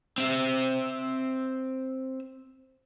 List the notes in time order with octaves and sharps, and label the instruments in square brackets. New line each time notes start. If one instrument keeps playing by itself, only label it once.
[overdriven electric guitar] C4 E5